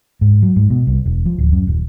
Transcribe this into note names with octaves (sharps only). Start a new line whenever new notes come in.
G#2
F#3
G#2
B2
C2
E1
F3
D1
F#2
D#1